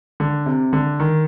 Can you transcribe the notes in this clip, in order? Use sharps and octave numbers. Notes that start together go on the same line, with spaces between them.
D3
C3
D3
D#3